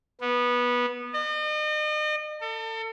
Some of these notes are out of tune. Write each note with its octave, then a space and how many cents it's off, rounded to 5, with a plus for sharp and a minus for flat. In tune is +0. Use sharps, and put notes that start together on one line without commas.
B3 -15
D#5 -40
A4 +35